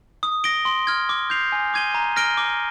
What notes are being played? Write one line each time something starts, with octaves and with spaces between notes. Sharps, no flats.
D#6
A#6 D7 G7
C6
F6 G#6
D6
G6 C7 F7
G#5
D6 G#6 D#7 G7
A#5
F6 A#6 D7 G7
D6